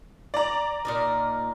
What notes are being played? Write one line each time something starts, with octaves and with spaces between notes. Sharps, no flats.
D5 A#5
A#2 D#4 A#4